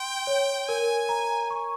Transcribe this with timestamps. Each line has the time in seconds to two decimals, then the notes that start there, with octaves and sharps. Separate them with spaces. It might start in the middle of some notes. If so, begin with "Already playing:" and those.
Already playing: G5 C6
0.27 C#5
0.68 A#4 G#5
1.09 A#5
1.50 C#6